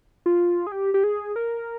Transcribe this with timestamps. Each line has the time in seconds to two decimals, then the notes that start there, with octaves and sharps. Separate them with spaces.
0.26 F4
0.67 G#4
0.72 G4
0.94 G4
1.04 G#4
1.36 A#4